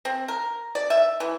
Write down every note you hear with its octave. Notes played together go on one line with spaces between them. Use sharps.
C4
A#4
D5
E5
E3